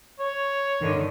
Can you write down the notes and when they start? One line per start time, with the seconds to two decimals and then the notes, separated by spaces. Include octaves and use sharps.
0.19 C#5
0.80 G2 D3 D#3